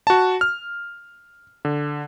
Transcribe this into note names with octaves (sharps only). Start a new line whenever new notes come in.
F#4 A5
F6
D3